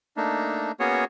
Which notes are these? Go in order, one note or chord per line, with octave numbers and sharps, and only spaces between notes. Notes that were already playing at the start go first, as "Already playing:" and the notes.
A3 A#3 D4 D#4
A#3 B3 C#4 F#4 G#4 C#5